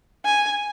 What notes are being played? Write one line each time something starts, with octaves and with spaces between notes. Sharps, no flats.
G#5